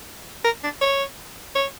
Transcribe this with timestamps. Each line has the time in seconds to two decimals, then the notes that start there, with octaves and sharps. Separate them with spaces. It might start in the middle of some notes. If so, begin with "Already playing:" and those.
0.44 A#4
0.63 D4
0.81 C#5
1.55 C#5